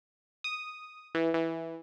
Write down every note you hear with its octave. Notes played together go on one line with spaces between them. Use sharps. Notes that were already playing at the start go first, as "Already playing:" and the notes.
D#6
E3
E3